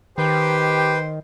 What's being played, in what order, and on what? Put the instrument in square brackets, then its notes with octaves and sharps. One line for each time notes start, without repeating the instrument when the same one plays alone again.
[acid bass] D#3 [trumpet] G4 [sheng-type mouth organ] B4 G5 [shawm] C5